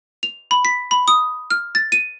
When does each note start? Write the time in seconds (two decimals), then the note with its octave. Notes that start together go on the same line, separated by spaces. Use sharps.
0.23 F7
0.51 B5
0.65 B6
0.91 B5
1.08 D#6
1.50 F6
1.75 A6
1.92 D#7